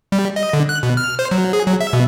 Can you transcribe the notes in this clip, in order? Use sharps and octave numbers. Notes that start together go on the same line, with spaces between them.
G3
D#5
D3
F#6
B2
F6
C5
F#3
G#4
F#3
E5
B2